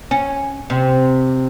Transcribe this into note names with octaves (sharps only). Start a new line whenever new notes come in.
C#4
C3